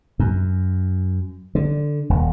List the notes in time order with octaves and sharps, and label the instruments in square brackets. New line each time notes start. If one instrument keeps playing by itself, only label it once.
[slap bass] F#2
D3
D#1